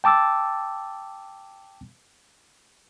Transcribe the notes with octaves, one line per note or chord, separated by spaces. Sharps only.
G5 A5 D6 E6 A6